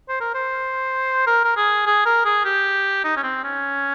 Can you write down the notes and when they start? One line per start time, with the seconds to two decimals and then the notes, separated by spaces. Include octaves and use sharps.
0.09 C5
0.21 A#4
0.34 C5
1.27 A#4
1.44 A#4
1.56 G#4
1.86 G#4
2.06 A#4
2.25 G#4
2.45 G4
3.04 D#4
3.16 C#4
3.23 C4
3.44 C#4